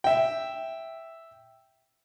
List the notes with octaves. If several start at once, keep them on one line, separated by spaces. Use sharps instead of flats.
E5 G5